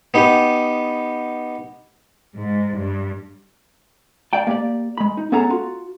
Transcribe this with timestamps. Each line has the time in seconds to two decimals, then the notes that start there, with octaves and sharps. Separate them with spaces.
0.14 B3 D#4 G4
2.37 G#2
2.74 G2
4.33 D5 F5 G5 A5
4.47 A#3 G4 D5
4.98 G#3 B5
5.17 D#4
5.32 B3 C#4 G#4 A4 F#5 A#5
5.50 F4 F#4